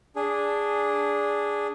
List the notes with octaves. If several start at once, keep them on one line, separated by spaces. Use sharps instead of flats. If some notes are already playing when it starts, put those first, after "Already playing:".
D4 G#4